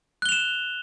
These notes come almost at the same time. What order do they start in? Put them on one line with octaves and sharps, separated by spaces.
F#6 G7 F7 E7